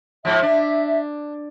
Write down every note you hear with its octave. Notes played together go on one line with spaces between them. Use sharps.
G#2 F3 E5
D4